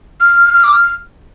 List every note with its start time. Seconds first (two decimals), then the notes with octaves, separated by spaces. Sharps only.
0.21 F6
0.53 F6
0.63 D6
0.73 F6